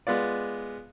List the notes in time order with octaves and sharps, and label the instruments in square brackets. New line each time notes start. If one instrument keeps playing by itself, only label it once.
[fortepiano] G#3 B3 F4 D5